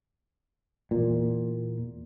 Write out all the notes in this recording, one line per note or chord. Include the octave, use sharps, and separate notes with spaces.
E2 A#2